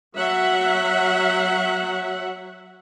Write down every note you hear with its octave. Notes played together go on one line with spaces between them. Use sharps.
F#3 E5 F#5